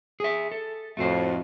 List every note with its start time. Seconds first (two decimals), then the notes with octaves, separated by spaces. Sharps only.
0.20 G#4 E5
0.52 A4
0.97 F2 A2 A3 F#4 C5